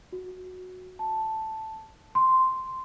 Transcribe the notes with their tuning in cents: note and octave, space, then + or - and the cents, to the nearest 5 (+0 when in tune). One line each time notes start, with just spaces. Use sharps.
F#4 -10
A5 +0
C6 -5